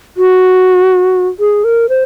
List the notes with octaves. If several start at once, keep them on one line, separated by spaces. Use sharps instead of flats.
F#4
G#4
A#4
C5